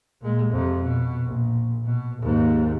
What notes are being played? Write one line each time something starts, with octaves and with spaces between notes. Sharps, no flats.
A#2 G#3
F2 C3
B2
A#1
B2
D#2 G#2